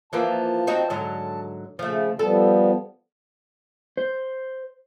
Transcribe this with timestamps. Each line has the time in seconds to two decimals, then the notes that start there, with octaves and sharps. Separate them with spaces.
0.13 E3 F3 A#3 A5
0.67 C4 D#4 F#4
0.90 G#2 D3 F#3
1.79 C#3 F3 A3
2.19 F3 G3 B3 A4
3.97 C5